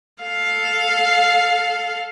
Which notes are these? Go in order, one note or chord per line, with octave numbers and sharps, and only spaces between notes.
A4 F5